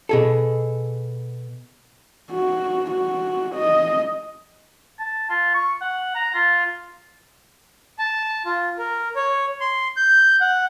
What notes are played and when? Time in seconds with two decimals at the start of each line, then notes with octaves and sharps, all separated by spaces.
0.09 B2 G#4 A4
2.32 F#4
2.90 F#4
3.55 D#5
4.99 A5
5.29 F4
5.54 C#6
5.81 F#5
6.15 A#5
6.34 F4
7.99 A5
8.45 F4
8.78 A#4
9.16 C#5
9.60 C6
9.97 G6
10.41 F#5